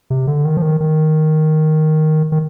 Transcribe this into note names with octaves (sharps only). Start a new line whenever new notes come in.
C3
D3
D#3
F3
D#3
D#3
D#3